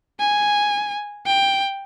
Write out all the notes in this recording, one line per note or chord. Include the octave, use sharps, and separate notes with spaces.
G#5
G5